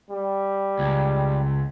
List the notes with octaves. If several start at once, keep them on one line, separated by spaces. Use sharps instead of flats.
G3
C#2